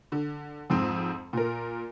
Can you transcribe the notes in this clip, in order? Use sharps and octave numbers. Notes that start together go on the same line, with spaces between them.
D3
F2 G#2 C4
A#2 A#4